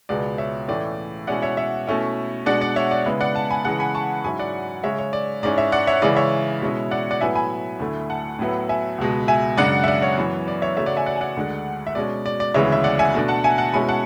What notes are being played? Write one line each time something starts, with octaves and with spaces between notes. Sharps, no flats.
C#2 B2 G#3 B3 D5
C#5 E5
A2 E3 A3 C#4 E4 D5
B2 G#3 C#4 E4 D5 F#5
C#5 E5
C#5 E5
B2 A3 C#4 E4
B2 G#3 D4 D5 F#5
D5
C#5 E5
D5
C#3 G#3 B3 E4
D5 F#5
F#5 A5
G#5 B5
C#3 E3 G#3 B3 F#5 A5
G#5 B5
A5 C#6
G#2 F#3 C#4 E4 G#5 B5
D5 F#5
C#3 G#3 C#4 C#5 E5
C#5
D5
G#2 G#3 C#4 E4 D5
C#5 E5
D5 F#5
C#5 E5
C#3 E3 G#3 C#4 E4 D5
C#5 E5
B2 G#3 C#4 E4
D5 F#5
D5 F#5
A2 F#3 B3 E4 E5 G#5
G#5 B5
D2 D3 A3 E4
F#5 A5
A2 F#3 B3 E4
E5 G#5
C#2 B2 G#3
E5 G#5
F#2 C#3 G#3 D4 D5 F#5
E5
D5 F#5
C#5
F#2 E3 B3
D5
C#5 E5
C#3 F#3 A3 C#5 E5
D5 F#5
E5 G#5
D5 F#5
G#5
D5 F#5
D2 D3 G#3 D4
E5
B2 G#3 C#4 D5
D5
D5
D2 C#3 E3 G#3 B3 C#5 E5
E5
D5 F#5
E5 G#5
B2 A3 D4
F#5 A5
E5 G#5
F#5 A5
B2 G#3 C#4 E4 G#5 B5
F#5 A5